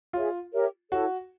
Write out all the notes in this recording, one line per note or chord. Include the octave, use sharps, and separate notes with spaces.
F4 G#4 C#5 E5
G4 A#4 C#5 E5
E4 F#4 A4 C#5